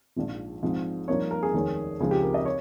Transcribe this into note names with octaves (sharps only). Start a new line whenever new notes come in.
A#1 G#2 F3
G#2 F3 C4
G2 F3 A#3 D#4 C#5
A#4
G#4
F1 D#2 D#3 G#3 C#4
C#2 C#3 F3 C4 D#4 G#4
G4
A#4
D#5
C#5